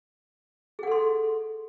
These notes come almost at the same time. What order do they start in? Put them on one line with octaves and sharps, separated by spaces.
G#4 F#5 A4 C6